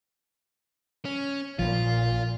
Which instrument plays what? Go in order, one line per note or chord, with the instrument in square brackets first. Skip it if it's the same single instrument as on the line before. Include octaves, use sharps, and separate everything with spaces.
[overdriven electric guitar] C#4
[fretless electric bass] A#1 F3 [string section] A#2 [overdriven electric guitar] F4